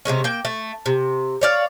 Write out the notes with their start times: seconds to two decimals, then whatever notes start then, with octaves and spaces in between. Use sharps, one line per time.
0.05 C3 D#3 G#3 C#4
0.24 A#3 G5
0.45 A3
0.86 C3
1.41 C#5 D5 F5